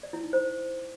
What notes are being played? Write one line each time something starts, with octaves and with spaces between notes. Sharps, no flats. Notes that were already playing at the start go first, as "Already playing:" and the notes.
D5
E4
D#4
C5